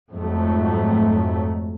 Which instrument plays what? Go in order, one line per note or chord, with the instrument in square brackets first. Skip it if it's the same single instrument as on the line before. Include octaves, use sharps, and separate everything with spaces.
[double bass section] F2 G#2 F#3 A3